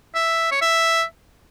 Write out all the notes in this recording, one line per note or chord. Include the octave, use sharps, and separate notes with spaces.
E5
C#5
E5